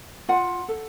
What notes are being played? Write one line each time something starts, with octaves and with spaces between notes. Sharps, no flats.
F4 F#5
A4